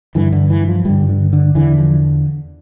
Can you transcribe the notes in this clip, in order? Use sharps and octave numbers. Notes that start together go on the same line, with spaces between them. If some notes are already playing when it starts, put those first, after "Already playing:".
G2 D3 E3
D3
E3
F3
G2 D3 G3
D3
D3
E2 D3 E3
F3